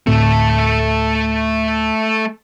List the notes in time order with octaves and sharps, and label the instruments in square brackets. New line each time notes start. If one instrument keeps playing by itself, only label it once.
[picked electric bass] D2 A2 C4 [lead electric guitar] A3 A4